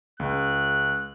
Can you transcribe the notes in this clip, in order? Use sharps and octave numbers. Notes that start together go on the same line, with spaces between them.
C#2 F#6